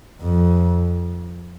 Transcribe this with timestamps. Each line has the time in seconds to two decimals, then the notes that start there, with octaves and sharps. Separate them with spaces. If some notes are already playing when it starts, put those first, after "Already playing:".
0.22 F2